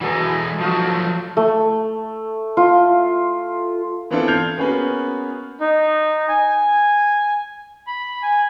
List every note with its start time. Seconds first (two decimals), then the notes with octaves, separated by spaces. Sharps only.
0.01 E3 F#3 G#3 B3 A4
0.20 A3 E4
0.61 F3 F#3 D#4 F4 F#4
0.87 A4
1.37 A3
2.57 F4
4.11 E3 B3 C4 D4 F4 A4
4.28 F6 G6 G#6 C7 F7
4.57 A#3 B3 C#4 F#4 G#4 B4
5.60 D#4
6.28 G#5
7.87 B5
8.23 G#5